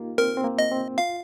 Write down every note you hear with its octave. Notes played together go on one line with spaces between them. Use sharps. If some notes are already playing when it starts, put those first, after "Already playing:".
Already playing: A#3 D#4 F4 G4
C4 A#4
C4
A#3
D#5
C4
F4 F5